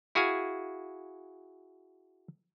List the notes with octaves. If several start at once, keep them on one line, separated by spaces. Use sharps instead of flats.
E4 F#4 G#4 F5 G#5